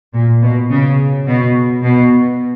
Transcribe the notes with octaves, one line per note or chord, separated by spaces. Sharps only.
A#2
B2
C#3
B2
B2